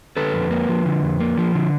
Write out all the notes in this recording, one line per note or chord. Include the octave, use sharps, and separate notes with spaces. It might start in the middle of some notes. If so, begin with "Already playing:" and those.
D3 A4 B4
F2
A#3
F3
D3
F2
A#3
F3
D3